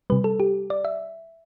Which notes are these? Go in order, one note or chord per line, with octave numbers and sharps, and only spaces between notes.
C3 G3 B4
A4
G4
D5
E5